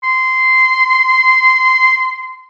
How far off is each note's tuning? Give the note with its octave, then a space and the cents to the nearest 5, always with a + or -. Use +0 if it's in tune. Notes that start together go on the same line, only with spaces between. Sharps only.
C6 -15